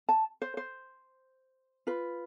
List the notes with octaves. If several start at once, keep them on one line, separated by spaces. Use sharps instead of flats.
A5
C5
C5
F4 B4